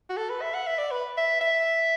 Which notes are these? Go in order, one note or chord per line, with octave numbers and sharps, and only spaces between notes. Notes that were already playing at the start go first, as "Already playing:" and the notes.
F#4
A4
B4
E5
F#5
E5
D5
B4
E5
E5